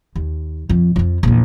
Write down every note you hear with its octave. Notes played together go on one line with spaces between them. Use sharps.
D#2
F2
F2 F3
A#1 E2